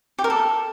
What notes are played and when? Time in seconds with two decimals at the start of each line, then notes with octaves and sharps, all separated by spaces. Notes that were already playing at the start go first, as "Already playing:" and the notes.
0.19 G4
0.24 A#4
0.30 A4